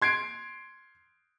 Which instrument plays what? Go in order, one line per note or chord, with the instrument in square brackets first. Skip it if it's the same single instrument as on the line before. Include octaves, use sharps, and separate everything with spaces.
[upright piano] C6 G#6 C7 D7